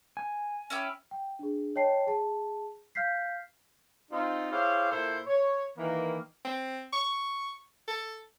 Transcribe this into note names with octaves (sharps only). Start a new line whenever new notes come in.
G#5
C#4 E4 G4
G5
D4 G#4
C#5 D#5 G5 A5 C7
G#4 A5
F5 F6 G6 B6 C7
C4 D#4 F4
E4 G4 G#4 C5 C#5 F5
A#2 E4 A4 C5
C#5
D#3 E3 A#3
C4
C#6
A4